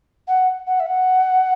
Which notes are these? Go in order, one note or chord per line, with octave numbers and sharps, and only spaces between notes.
F#5
F#5
E5
F#5